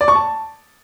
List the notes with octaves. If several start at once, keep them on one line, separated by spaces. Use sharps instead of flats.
D5
C#6
A5